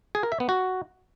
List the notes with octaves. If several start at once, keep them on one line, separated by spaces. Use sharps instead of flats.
G#4
A#4
E5
B3
F#4